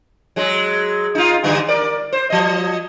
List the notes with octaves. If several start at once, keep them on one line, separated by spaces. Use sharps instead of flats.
F#3 G#3
D#4 F4
G#2 D3 G3
A#4 D5
C5
F3 D#5